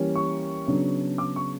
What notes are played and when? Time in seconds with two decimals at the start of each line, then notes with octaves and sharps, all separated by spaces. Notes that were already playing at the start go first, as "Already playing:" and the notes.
Already playing: E3 G3 A#3 C#4
0.16 C#6
0.67 C#3 F#3 B3 D4
1.18 D6
1.36 C#6